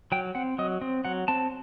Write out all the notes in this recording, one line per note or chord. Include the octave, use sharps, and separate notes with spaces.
F#3 G5
C4 F#5
F#3 D#5
C4
F#3 F#5
C4 A5